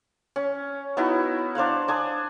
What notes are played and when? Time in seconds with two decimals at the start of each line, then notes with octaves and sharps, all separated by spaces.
0.36 C#4
0.97 B3 D#4 E4 F#4
1.55 D4 C5 F5 F#5
1.88 D4 G#5 D#6